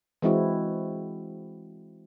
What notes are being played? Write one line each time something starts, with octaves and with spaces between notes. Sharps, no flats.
E3 G#3 C4 E4 F#4